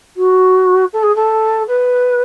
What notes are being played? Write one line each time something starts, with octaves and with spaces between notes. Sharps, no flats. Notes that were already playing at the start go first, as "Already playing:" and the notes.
F#4
A4
G#4
A4
B4